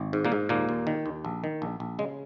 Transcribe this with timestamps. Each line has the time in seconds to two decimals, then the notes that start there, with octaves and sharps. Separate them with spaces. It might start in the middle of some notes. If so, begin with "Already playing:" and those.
Already playing: G#1
0.13 G#2
0.25 A#2 A#3
0.32 G#2
0.49 D#2 A#2 A#3
0.69 D#2
0.87 D#3
1.06 D#2
1.25 A#1
1.44 D#3
1.62 A#1
1.80 A#1
1.99 C#3 G#3